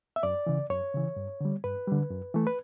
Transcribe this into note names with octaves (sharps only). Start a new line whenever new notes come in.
E5
F#2 D5
C#3 E3
F#2 C#5
C#3 E3
G2
D3 G3
G2 B4
D3 G3
F#2
E3 A3
B4